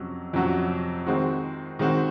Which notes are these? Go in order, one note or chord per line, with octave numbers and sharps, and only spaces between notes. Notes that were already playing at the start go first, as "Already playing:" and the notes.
Already playing: F2 C3 F#3 C#4
F2 C3 F#3 C#4 F#4
D#3 G#3 C4 F#4
D#3 G#3 C4 F#4